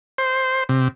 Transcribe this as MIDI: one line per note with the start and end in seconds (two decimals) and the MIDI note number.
0.18 0.64 72
0.69 0.88 48